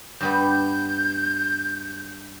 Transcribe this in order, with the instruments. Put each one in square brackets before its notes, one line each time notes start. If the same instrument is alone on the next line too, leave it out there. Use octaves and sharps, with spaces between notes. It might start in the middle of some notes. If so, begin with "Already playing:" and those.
[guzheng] G2 G3 B3 [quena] G6